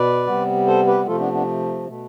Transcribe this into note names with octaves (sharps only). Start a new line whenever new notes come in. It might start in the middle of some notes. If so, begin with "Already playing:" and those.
Already playing: B2 B4 D5
C3 G3 B3
A4 C5
G4 B4
C3 F3 A3 F4 A4
B3 D4
B3 D4
B2 A3